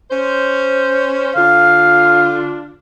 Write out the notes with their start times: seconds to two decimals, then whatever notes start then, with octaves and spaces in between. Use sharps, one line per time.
0.11 C#4 C5
1.36 D3 D4 F4 F5